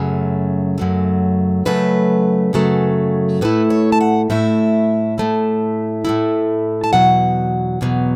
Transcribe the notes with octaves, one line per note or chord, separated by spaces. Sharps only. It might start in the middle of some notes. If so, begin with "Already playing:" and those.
Already playing: F#2 C#3 F#3 A3
F#2 C#3 F#3 A3
F#2 C#3 F#3 A3 B4
F#2 C#3 F#3 A3
A2 A3 E4 B4
C#5
A5
F#5
A2 A3 E4 E5
A2 A3 E4
A2 A3 E4
A5
E2 B2 F#3 F#5
E2 B2 F#3